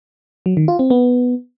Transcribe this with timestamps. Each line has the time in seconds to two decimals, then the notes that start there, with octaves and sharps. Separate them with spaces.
0.46 F#3
0.57 D#3
0.68 F4
0.79 C4
0.90 B3